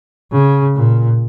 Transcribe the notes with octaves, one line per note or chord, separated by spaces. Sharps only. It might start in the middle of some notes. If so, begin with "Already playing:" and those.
C#3
A#2